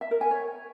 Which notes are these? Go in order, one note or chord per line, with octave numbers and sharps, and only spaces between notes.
E5
A#4
G#5
C#5